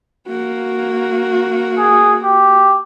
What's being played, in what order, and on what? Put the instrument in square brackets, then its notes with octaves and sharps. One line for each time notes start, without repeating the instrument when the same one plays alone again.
[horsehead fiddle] A#3 F#4
[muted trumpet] G#4
G4